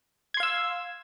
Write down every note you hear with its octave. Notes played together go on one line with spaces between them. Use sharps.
F5 C6 E6 G#6